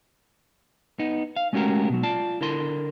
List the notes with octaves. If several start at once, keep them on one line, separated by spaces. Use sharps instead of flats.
B3 D#4
F5
G#3 A3 C#4 F#4 G4 A#4
B2 F#3
F4 D5 A5
D3 E4 A#4 C6